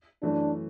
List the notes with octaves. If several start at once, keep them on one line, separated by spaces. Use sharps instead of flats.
F#2 E3 A3 D4